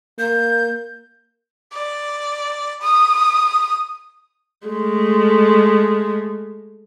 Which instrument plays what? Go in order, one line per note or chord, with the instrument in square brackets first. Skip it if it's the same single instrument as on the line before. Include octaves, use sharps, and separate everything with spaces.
[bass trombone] A#3 [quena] G6
[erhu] D5
D#6
[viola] G#3 A3